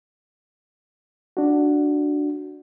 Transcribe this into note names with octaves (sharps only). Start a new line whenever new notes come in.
D4 F#4